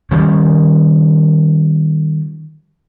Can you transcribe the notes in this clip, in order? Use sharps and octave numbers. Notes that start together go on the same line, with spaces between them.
D#3 F3 G3 C#4